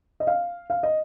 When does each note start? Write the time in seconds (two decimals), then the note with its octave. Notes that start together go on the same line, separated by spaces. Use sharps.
0.20 D#5
0.27 F5
0.70 F5
0.83 D#5